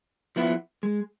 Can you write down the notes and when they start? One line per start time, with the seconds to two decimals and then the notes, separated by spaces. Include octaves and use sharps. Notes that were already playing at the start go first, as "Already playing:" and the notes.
0.36 F3 B3 E4
0.83 G#3